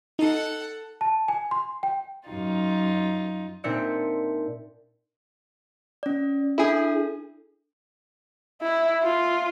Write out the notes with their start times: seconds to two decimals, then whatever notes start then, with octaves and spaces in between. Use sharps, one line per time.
0.19 D#4 A4 F#5
1.01 A5
1.28 G#5
1.51 C6
1.83 G5
2.29 F#2 D#4 F4
3.64 A#2 C4 D4 D#4 E5 C#7
6.03 C#4 D5
6.58 D4 E4 G#4 A4
8.62 E4
9.03 F4